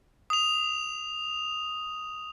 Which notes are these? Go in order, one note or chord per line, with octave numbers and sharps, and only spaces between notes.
D#6 F7